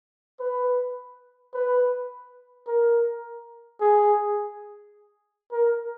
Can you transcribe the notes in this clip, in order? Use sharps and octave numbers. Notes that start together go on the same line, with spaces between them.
B4
B4
A#4
G#4
A#4